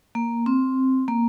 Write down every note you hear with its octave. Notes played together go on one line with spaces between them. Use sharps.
A#3
C4
A#3